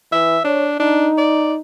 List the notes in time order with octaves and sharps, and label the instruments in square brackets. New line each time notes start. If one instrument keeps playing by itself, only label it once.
[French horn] E3 [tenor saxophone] E5
[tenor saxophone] D4 [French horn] C#5
[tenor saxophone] D4 [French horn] D#4
[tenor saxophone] D5